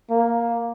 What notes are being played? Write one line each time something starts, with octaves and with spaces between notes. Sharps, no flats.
A#3